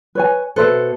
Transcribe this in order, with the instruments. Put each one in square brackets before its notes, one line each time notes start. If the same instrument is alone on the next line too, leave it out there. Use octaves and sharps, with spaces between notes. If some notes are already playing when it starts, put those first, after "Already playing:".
[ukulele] B4 C#5 G#5
[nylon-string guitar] B2 A4 [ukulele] B4 C5 E5